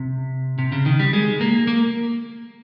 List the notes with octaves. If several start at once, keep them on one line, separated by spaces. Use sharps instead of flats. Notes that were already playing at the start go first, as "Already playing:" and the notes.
Already playing: C3
C3
C#3
D#3
G3
G#3
A#3
A#3